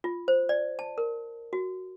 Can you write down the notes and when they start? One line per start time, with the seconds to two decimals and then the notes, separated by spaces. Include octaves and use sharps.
0.04 F4
0.28 C5
0.49 D5
0.79 A5
0.98 A#4
1.53 F#4